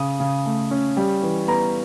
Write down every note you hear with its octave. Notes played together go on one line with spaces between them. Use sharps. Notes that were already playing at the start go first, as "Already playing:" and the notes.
Already playing: C#3 D#6
C#3
A3
C#4
G3
E3
B3 A#5